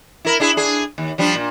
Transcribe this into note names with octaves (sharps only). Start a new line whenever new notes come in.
E4 A#4
D4 E4 G#4
D4 G#4
D#2
F3 G3 D4
A#2